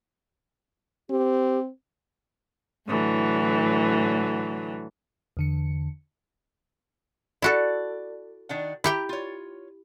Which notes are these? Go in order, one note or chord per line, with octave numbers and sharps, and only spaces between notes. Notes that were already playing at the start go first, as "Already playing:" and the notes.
C4 G4
A2 D3 E3 F#3
E2 D3 C#7
E4 F#4 A4 D5
D#3 D4 F#5
E4 G4 G5 A#5
F4 C#5